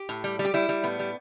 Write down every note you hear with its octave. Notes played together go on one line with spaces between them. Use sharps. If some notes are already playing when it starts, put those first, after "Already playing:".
Already playing: G4
A2
G3
G3
G4
G3 E4
G3
A2 B3
G3